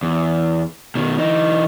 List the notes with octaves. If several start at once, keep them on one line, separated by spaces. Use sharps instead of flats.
E2
B2 D#3
E3 D#4